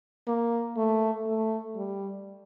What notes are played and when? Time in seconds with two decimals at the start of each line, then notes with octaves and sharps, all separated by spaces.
0.27 A#3
0.77 A3
1.27 A3
1.76 G3